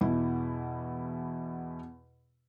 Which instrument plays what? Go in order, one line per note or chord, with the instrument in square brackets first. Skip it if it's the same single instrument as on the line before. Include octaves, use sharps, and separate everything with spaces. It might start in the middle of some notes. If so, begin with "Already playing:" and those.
[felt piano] E2 B2 E4